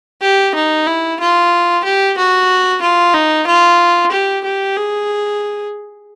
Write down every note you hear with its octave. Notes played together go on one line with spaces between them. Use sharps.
G4
D#4
E4
F4
G4
F#4
F4
D#4
F4
G4
G4
G#4